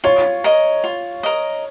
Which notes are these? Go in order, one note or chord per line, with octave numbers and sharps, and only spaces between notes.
F4 C#5
A#4 D#5
F4
A#4 D#5